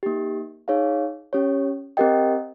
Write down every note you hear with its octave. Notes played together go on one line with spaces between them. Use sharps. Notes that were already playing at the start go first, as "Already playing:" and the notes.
A#3 D#4 G4
D#4 G#4 C#5 F5
C#4 G4 C#5
C4 G4 A#4 D#5 G5